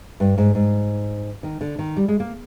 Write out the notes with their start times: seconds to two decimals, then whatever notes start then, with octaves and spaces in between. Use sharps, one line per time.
0.20 G2
0.38 G#2
0.55 G#2
1.43 D#3
1.61 D3
1.79 D#3
1.96 G3
2.08 G#3
2.20 A#3